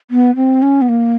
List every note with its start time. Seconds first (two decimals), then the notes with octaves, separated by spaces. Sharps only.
0.11 B3
0.36 C4
0.62 C#4
0.82 B3
0.89 A#3